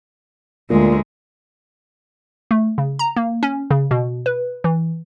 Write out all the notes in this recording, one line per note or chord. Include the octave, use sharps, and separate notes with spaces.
D2 A#2 G#3
A3
C#3
A#5
A#3
C#4
C#3
B2
B4
E3